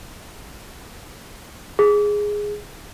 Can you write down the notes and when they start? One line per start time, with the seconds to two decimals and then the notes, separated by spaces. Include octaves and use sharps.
1.79 G#4